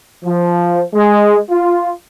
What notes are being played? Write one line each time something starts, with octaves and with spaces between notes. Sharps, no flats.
F3
G#3
F4